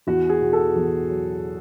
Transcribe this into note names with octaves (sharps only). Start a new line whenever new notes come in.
E2 F#4
G#4
B2
A4
E2
F#3